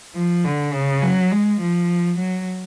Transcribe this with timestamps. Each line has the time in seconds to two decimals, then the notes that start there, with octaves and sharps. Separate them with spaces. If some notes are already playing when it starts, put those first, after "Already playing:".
0.15 F3
0.45 D3
0.74 C#3
1.02 F#3
1.32 G#3
1.61 F3
2.19 F#3